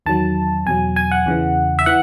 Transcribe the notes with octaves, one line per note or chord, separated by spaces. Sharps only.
E2 D#3 F#3 A5
E2 B2 F#3 G#5
G#5
F#5
E2 C#3 E3
E5
E3 F#5